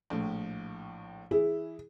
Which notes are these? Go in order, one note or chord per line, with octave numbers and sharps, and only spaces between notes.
A#1 A2
E3 E4 G#4